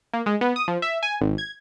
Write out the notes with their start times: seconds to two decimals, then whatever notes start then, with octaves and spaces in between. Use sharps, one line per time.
0.14 A#3
0.26 G#3
0.41 B3
0.56 D#6
0.68 F3
0.82 E5
1.03 G#5
1.21 G#1
1.38 G#6